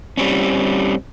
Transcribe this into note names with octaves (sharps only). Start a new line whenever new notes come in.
G3 C4 C#4